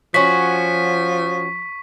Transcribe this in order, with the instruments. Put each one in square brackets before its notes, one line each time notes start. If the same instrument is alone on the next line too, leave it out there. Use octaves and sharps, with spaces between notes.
[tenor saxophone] F3 [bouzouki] C#4 F#4 [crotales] C#6 B6